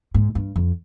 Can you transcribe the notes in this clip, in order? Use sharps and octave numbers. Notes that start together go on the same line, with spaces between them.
G#2
G2
F2